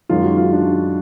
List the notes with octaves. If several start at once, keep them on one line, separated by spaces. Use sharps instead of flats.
F#2 D#3 G#3 F4
F#4
F4
D4